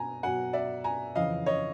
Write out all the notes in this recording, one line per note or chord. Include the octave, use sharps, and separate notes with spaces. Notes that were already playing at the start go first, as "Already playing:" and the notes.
Already playing: B2 G#5 A#5
B2 F#3 F#5 G#5
D5 E5
G#5 A#5
F2 C#3 E3 D#5 F5
C#5 D#5